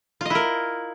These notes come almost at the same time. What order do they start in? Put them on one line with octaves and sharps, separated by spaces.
F4 D#5 E4 A#4